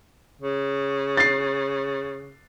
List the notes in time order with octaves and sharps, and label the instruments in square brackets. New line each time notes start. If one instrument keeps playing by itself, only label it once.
[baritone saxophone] C#3
[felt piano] A6 C7